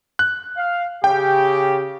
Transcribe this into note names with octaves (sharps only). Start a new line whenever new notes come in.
F#6
F5
C#3 G4 G5